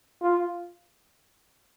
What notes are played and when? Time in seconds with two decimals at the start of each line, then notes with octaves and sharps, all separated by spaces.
0.21 F4